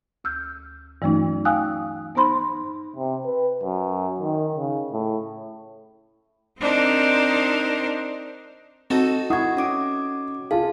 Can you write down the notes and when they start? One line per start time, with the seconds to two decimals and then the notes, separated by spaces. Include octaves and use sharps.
0.24 D2 E6 F6 G6
1.02 G2 E3 F#3 A3 C#4 D#4
1.45 F5 G5 G#5 D#6 E6 F#6
2.15 B3 D#4 C5 B5 C6
2.96 C3
3.25 B4
3.63 F#2
4.20 D#3
4.56 C#3
4.93 A2
6.60 C4 D4 D#4 A#4 C5
8.90 C4 D#4 F#4 A4
9.30 E4 F#5 C#6 D#6 G#6
9.57 C#4 D6 D7
10.51 F4 G#4 F5 A5